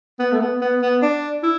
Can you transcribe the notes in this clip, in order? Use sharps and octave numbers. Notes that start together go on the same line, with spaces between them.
B3
A3
B3
B3
B3
D4
E4